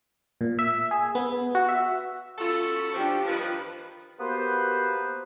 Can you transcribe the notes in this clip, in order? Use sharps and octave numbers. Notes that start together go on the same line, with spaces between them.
A#2
E5
G#4
B3
F#4
E5
C#4 F4 F#4 A4 B5
F3 D4 G4
G2 D#3 F3 F4 B4
A#3 B3 F#4 G4 B4 C5